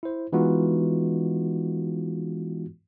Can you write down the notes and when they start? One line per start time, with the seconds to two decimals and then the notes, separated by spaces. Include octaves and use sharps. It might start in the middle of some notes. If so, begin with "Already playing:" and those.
0.03 E4 C5
0.33 E3 G#3 B3 D#4 F4 F#4